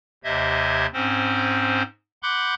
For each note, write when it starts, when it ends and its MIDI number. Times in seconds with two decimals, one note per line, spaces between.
0.24 0.86 39
0.24 0.86 48
0.24 0.86 72
0.24 0.86 75
0.24 0.86 76
0.24 0.86 92
0.93 1.83 44
0.93 1.83 60
0.93 1.83 61
0.93 1.83 72
2.23 2.55 78
2.23 2.55 83
2.23 2.55 84
2.23 2.55 86
2.23 2.55 90
2.23 2.55 91